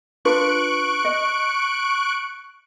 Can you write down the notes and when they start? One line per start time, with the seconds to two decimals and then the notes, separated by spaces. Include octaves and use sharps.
0.25 D4 F4 B4 C#6 F#6 D7
1.05 D#5